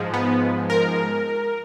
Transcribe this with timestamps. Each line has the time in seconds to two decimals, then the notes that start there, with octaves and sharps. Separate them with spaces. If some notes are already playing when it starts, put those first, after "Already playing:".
Already playing: G#2 F3 G#3
0.14 B3
0.70 A#4